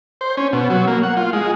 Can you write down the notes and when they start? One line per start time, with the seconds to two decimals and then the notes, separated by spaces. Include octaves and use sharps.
0.21 C5
0.37 C#4
0.53 B2
0.70 F#3
0.87 A#3
1.03 F#5
1.17 F4
1.33 G#3